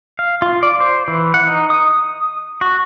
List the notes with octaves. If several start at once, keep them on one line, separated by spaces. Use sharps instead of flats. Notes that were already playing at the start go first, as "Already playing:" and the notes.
F5
F4
D5
C5
E3
F#5
D#4
D#6
F#4